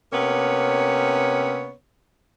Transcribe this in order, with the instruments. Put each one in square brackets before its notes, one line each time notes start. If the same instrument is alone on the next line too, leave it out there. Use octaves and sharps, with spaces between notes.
[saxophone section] C3 A#3 B3 C#4 C#5